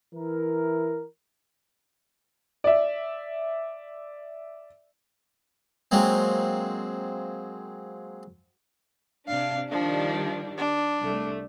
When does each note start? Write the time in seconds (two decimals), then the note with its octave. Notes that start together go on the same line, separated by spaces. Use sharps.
0.14 E3 E4 A#4
2.64 D5 E5
5.91 F#3 G#3 A#3 C4
9.28 C3 D4 F5
9.71 D#3 F3 G3 D4
10.58 D4
11.00 C2 A3